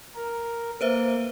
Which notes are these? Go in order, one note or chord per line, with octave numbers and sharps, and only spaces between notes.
A#4
A#3 B4 C5 E5